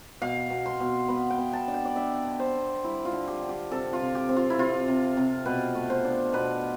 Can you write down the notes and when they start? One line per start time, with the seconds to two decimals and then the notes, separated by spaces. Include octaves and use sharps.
0.22 B2 F5
0.50 B2
0.66 C6
0.80 B2
1.08 B3 B5
1.30 G5
1.38 B3
1.53 A5
1.68 D4
1.74 G5
1.85 D5
1.96 D4 E5
2.25 D3
2.40 C5
2.55 D3
2.84 G3 E4
3.05 F4
3.12 D3
3.28 G4
3.42 D3
3.49 G4
3.71 C3 A4
3.93 F4
4.01 C3
4.15 G4
4.29 C4
4.36 F4
4.50 E4
4.58 C3 F4
4.88 C3
5.17 C3
5.45 B2 B4
5.75 A3
5.90 C5
6.05 D4
6.33 B2 B4